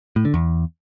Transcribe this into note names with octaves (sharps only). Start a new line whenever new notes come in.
A2
D3
E2